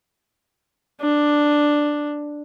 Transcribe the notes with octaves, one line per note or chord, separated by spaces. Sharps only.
D4